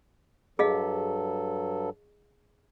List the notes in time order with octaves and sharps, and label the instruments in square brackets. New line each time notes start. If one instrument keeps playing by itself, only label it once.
[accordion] G2 F#3 A4 [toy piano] G#4 D#5 F5